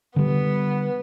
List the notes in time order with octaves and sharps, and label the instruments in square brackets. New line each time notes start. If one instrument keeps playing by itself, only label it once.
[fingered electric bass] D3 G3 [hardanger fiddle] B3